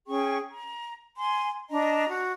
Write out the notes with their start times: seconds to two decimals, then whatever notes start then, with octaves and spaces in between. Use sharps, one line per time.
0.07 C#4 G#4 G5 C#6
0.50 A#5
1.16 G#5 C6
1.69 D4 D#5 A#5
2.08 F#4